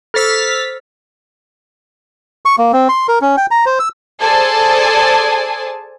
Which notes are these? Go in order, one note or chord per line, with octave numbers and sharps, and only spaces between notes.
A4 C5 E6 F6 A6 B6
C#6
A#3
C4
C6
A#4
C#4
G5
A#5
C5
E6
G#4 A4 C5 D5 G#5 A5